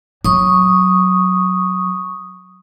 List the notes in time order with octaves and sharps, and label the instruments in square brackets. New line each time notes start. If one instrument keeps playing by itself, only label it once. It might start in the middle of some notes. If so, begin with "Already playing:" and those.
[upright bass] F#3 [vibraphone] C#6 D#6